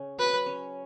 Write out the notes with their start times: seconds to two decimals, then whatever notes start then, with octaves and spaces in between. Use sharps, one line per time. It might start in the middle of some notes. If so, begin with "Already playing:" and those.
Already playing: C#3 C#4
0.19 F#3 B4
0.46 C#4